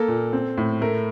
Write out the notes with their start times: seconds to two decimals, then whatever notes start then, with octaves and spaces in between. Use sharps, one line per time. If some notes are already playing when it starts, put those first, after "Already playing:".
Already playing: A#3 A4
0.08 A#2
0.33 C4
0.58 A2
0.81 A3 A#4